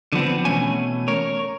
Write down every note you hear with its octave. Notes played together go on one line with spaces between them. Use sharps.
D3 F3 B3 C4
B2 E3 A3 C#4 G#5
A#4 C#5